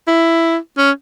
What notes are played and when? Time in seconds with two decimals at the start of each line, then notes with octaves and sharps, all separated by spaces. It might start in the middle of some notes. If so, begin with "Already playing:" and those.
0.07 E4
0.78 C#4